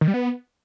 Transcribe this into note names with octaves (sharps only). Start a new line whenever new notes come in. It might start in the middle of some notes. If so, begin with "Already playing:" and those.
D#3
G3
B3